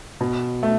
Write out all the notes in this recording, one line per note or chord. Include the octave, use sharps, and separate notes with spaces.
B2
A3